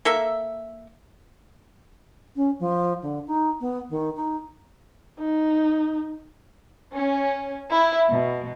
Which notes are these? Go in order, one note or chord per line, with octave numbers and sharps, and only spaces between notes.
A#3 A4 E5
C#4
F3
D3
D#4
B3
D#3
D#4
D#4
C#4
E4
B2